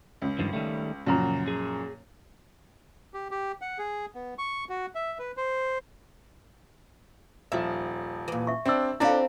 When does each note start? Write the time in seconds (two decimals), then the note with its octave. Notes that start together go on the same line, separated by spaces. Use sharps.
0.22 C#2
0.39 G2 D#3 F3
0.53 D#3 G3 A3
1.07 F#2 A#2 C#3 F3 F#4 A#5
1.48 G#4
3.14 G4
3.31 G4
3.61 F#5
3.78 G#4
4.15 B3
4.38 C#6
4.69 F#4
4.95 E5
5.19 B4
5.37 C5
7.52 D#1 F3 E5
8.28 A#2 E3
8.47 E5 C#6
8.66 G3 C4 D4 E5 E6
9.00 C4 D4 E4 F4 A4 C#5 F5